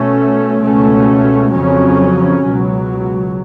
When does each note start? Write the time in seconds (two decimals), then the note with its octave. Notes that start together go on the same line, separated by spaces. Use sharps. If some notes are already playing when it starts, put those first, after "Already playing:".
Already playing: B2 A3 C#4
0.63 C#2 B2 A3 C#4
1.53 F2 C#3 F#3 C#4
2.44 C#2 B2 F#3